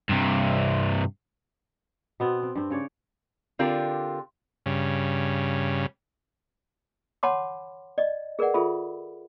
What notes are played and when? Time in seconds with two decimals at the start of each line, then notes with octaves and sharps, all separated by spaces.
0.09 G2 C3
2.20 B2 B3 C4
2.43 C4
2.55 G2 C4
2.70 C#3 C#5 D5
3.59 D3 C4 F4 G4 A#4
4.66 G2 C#3
7.23 C#5 F#5 A5 B5 C6 D6
7.98 D5 D#5
8.39 G#4 A#4 B4 D5 F#5
8.54 F4 G#4 A4 E5 B5